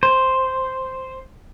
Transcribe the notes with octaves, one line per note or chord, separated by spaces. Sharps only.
C5